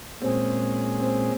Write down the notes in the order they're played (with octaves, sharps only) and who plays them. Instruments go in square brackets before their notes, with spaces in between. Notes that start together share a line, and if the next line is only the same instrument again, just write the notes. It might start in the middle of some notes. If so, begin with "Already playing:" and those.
[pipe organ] A#2 G#3 C#4 G#4 [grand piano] C4
[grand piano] C4